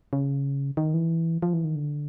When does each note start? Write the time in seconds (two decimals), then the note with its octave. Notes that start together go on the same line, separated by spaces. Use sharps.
0.13 C#3
0.77 D#3
0.94 E3
1.42 F3
1.53 E3
1.64 D#3
1.75 D3